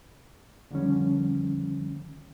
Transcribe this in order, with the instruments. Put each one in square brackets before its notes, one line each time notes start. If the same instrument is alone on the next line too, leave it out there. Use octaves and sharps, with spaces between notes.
[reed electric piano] F2 D3 D#3 F3 G3 C#4